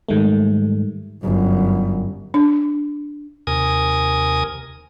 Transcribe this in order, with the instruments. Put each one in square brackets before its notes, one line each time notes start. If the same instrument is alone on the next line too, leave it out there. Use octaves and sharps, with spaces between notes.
[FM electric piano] G#2 D#3 G3 A3
[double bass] G1 F#2
[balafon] D4
[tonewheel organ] D#2 C3 A#4 G#5 D#6